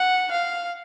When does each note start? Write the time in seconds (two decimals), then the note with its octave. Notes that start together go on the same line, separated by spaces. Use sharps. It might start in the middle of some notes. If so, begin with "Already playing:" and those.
Already playing: F#5
0.31 F5